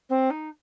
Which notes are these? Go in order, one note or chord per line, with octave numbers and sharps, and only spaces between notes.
C4
D#4